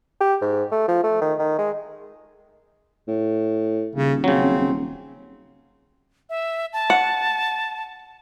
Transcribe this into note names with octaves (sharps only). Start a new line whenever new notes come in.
G4
G#2
A3
F3
A3
D#3
D#3
G#3
A2
D#1 C#3
C#3 F#3 C4
E5
A5
F#5